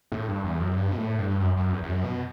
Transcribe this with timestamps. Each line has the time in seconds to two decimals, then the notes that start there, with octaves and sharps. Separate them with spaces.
0.12 A2
0.28 G2
0.44 E2
0.60 F#2
0.76 G2
0.92 B2
0.97 A2
1.18 G2
1.40 F#2
1.57 F#2
1.73 E2
1.83 E2
1.89 F#2
2.04 B2